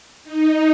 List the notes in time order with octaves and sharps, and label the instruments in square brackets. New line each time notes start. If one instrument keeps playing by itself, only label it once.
[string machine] D#4